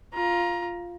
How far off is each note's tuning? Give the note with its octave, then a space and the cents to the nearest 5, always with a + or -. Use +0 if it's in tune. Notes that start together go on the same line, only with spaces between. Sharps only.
F4 +0 A#5 +20